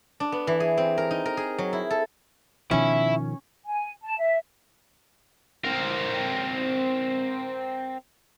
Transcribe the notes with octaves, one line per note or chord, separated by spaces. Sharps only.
D4
B3
E3
G#4
C4
A#4
D#4
A#4
G#4
F#3
E4
A4
B2 D#3 F3 C#4 E4
G#5
A5
E5
C4 A#4